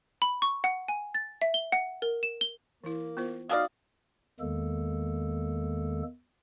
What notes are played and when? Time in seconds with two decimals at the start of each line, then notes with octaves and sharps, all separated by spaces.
0.22 B5
0.42 C#6
0.64 F#5
0.88 G#5
1.14 A6
1.42 E5
1.54 G7
1.72 F#5
2.02 A#4
2.23 E7
2.41 G7
2.84 E3 A#3 E4
3.17 B3 F4 C5
3.49 F#3 D#4 F#4 A4 D5 D#5 F5
4.40 E2 D#3 G#3 A#3 A4